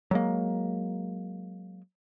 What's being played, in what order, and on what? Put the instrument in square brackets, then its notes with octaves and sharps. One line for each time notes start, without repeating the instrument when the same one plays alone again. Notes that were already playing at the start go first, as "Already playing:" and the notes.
[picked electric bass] F#3 G#3 A#3